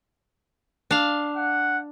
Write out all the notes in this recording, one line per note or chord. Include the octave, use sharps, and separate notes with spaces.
D4 F5
F#5